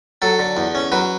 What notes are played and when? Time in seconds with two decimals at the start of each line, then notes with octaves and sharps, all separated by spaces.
0.22 F#3 A4
0.39 D3
0.57 E2
0.75 C#4
0.92 F#3 B4